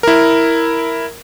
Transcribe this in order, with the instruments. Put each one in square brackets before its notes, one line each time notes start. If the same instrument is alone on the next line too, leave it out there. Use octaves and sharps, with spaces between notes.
[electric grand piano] E4 A#4